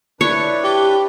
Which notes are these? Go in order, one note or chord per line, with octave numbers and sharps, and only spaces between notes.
D4 E4 B4 C#5
G4